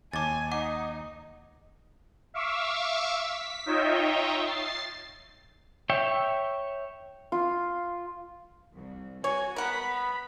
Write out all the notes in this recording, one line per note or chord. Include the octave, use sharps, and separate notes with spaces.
D#2 G#5 A5 D6 A6
D#4 F#5 D6
E5 F5 C#6 D6 E6
B6
D#4 F4 C#5 D#5 E5 G5
A6 C7
C#5 E5 G5
F4
C2
F#4 C#5 G#5
B3 A#4 F#5 B5